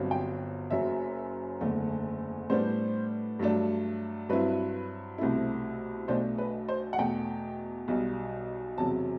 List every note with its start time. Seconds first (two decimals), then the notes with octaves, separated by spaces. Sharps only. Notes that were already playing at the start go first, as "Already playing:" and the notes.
Already playing: G1 G2 F#3 C4
0.11 G5
0.71 F#1 F#2 F#3 E5
1.61 F#1 E2 D3 A3
2.50 A2 G3 B3 D4 C5
3.39 G2 F#3 A3 D4
4.29 G2 F#3 C4 E4 B4
5.18 C2 B2 A3 C4 E4
6.08 B1 B2 A3 D4 C5
6.38 B4
6.69 C5
6.93 F#5
6.98 E2 B2 A3 G5
7.88 B1 B2 G3
8.77 E1 E2 C3 F#3 A5